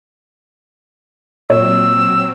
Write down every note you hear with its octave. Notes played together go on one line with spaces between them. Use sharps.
A#2 F#3 C4 C#5 E6